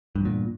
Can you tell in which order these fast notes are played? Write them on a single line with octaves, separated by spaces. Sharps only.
G2 E2 A#2